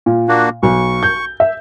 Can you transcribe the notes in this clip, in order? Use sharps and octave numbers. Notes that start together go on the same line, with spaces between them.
A#2
A#3 D4 F#4
B1 C#6
G6
E5